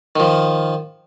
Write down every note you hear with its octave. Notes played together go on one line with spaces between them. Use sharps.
D#3 F3